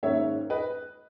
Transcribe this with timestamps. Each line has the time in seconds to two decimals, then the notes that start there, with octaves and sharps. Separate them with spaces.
0.03 G#2 D#3 A#3 C#4 C#5 E5
0.50 B4 D#5